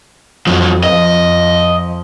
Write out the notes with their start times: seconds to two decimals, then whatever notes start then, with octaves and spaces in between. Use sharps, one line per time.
0.47 F2 F3 F#3
0.84 F2 F3 D#5